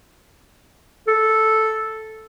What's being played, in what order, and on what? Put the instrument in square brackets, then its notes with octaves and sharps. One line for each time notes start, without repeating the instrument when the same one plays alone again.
[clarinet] A4